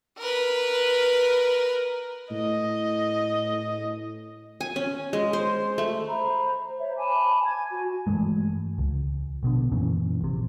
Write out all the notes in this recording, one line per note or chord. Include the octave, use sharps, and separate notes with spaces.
A#4 B4
A2 D#5
G#5
C#4
G#3
C5
A3
C5 A#5 B5
C5 C#5 E5
G#5 A5 B5 D6
G#6
F#4 G#5
G2 E3 G#3 A3
C#2
A#1 B2 D3
F#2 A#2 E3 C#4
A#1 C3